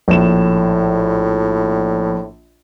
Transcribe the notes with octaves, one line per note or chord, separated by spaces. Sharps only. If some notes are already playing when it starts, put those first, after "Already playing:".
A#1 A2 E7